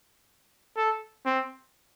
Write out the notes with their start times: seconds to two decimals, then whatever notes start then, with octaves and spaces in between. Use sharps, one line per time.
0.77 A4
1.26 C4